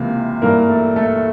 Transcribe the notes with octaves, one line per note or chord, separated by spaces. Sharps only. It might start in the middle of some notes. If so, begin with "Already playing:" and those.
Already playing: C#2 C3 E3 A#3
G2 E3 A#3 A#4
A3 A4
A3 A4